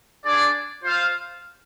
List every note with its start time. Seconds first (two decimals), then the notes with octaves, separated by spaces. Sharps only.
0.25 D4 G#4 D5
0.83 F4 C5 F5